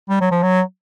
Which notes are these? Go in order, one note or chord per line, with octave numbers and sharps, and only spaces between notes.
G3
F#3
F3
F#3